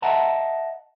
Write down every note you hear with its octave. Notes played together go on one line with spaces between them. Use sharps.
D#5 E5 F#5 A5 A#5